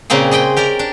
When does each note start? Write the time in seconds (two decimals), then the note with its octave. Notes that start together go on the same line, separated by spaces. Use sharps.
0.10 A#2 C#3 A#3 C4 G#4
0.31 G#4 D#5 G5 B5
0.57 G4 A#4 D5 A#5
0.79 D4